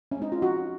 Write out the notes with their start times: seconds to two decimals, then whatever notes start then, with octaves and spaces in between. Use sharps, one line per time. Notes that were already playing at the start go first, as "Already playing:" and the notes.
0.11 C#4
0.17 G#3 C4 D#4
0.32 F4
0.42 F3 D#4 F#4